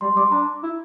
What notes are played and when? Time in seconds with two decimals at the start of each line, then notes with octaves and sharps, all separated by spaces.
0.01 G3 C6
0.16 G3 D6
0.32 D4 A#5
0.63 E4